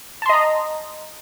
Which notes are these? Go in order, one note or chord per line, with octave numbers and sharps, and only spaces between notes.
D#5 A5 A#5 C6